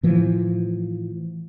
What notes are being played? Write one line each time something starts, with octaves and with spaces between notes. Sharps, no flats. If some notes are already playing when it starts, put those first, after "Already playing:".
A2 E3 F3